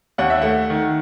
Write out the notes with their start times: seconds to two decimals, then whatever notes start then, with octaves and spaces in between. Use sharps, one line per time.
0.18 D#2 F#5
0.30 E5
0.41 A3 F#5
0.70 D#3